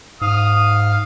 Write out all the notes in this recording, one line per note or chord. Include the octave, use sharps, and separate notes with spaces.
G#2 F5 D#6